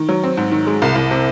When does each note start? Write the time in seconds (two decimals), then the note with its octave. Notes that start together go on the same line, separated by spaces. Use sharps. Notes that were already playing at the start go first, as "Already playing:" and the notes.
Already playing: D#3
0.09 F#3
0.23 C4
0.38 G#2
0.52 D#3
0.67 G#3
0.82 C2
0.95 C2
1.11 C3